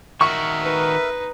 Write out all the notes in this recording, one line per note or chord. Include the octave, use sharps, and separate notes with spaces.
D#3 F#4 A#4 E5 C#6
D#4 B4